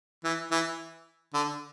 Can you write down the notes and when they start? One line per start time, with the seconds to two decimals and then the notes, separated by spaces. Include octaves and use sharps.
0.24 E3
0.51 E3
1.34 D3